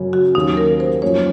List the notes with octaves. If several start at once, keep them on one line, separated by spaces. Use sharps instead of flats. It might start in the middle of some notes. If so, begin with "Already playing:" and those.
Already playing: F#2 C#3 F#3 C#4
F#4
D#2 D#3 F#3 C#4 D#4
A#4
C5
F#2 F3 A#3 C#4 C#5